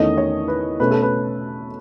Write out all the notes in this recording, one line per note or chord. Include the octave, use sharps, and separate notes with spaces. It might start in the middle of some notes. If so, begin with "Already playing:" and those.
Already playing: E2 D#3 A3 C#4 D#5
C#5
B4
B2 A3 C#4 B4
A4
B4